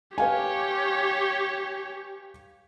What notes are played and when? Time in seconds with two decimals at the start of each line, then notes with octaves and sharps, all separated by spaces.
0.18 G4 B4 C#5 F5 G#5